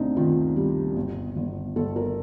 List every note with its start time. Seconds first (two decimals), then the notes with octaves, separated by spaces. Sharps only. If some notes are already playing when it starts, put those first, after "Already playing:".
Already playing: D2 C3 D4 D#4
0.17 D#3 F4
0.56 G3
0.96 G1
1.36 G1
1.76 G1 A4
1.96 A#4